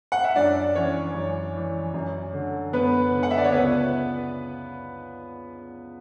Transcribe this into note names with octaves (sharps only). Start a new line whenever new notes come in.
F#5
E5
F#2 D4 D5
E3 C#4 C#5
F#2
E3
F#2
D3
F#2 B3 B4
D3
F#5
E5
D5
C#5
C#2 B3 B4